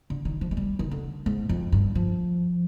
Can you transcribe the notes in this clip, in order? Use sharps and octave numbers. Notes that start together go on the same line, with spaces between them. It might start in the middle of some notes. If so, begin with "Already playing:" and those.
D3
D#3
F3
G#3
G3
D#3
D3
G#2
F2
G2
F3